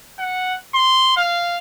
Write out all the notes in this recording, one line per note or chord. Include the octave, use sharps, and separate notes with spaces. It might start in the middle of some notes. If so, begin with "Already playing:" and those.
F#5
C6
F5